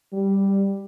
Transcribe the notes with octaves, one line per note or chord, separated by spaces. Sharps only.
G3